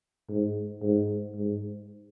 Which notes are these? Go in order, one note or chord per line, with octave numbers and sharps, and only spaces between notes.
G#2
G#2
G#2